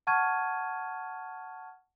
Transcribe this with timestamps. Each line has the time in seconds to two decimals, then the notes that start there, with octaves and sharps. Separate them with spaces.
0.07 F#5 A5 C#6 F6 G#6 D#7